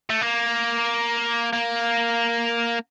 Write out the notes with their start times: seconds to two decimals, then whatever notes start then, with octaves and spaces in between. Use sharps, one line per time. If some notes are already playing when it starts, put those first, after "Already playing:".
0.10 A3
0.22 A#3
1.53 A#3